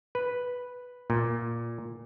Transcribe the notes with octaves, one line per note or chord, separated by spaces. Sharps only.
B4
A#2